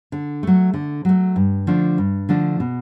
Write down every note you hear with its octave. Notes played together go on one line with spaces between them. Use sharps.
D3
F#3 A3
D3
F#3 A3
G2
D3 F3 A3 D4
G2
D3 F3 A3 D4
B2